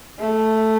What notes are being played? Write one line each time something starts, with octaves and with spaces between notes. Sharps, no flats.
A3